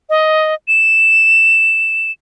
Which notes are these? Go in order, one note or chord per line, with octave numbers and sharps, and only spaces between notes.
D#5
E7